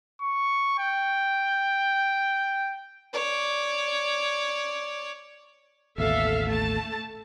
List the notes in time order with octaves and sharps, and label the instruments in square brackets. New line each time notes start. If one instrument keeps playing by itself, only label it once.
[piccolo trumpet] C#6
G5
[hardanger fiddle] C#5 D5
[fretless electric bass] A1 D#2 B2 [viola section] A4 E5 F5
[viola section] A3 A5